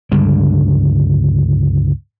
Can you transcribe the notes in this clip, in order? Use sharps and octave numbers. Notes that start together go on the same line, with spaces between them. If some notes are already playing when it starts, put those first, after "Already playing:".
C#2 G2 D3 G3